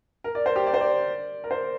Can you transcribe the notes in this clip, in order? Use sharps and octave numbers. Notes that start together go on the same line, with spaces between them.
A#4
D5
C5
G4
D5
C5
D5
A#4
C5